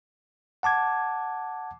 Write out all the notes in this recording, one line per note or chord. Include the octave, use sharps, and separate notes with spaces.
F#5 A5 D6 G#6